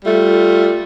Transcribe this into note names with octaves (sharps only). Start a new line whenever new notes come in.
G3 A3 F4